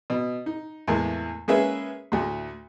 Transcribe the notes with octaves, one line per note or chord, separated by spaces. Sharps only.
B2
D#4
E2 A2 E3 G#3 A#3
G#3 A#3 C#4 G#4 B4 E5
D2 A2